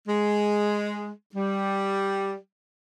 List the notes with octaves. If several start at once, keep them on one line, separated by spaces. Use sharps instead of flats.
G#3
G3